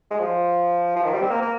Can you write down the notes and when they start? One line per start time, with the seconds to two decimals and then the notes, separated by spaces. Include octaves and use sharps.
0.10 G#3
0.19 F3
0.96 F3
1.04 D#3
1.13 G3
1.22 C4
1.30 A#3
1.42 A#3